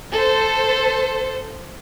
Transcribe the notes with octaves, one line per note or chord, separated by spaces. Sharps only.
A4 C5